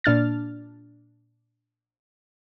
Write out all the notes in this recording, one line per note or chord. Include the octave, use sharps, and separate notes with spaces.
A#2 D4 F6 A6